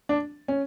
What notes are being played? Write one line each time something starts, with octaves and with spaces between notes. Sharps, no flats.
D4
C#4